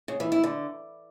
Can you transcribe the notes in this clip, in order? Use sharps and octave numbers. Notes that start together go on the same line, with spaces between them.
C#3
E3
E4
D3